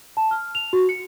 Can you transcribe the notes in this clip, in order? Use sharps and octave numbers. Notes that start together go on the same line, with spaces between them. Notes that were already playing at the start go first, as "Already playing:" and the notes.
A5
F6
F7
F#4
C#7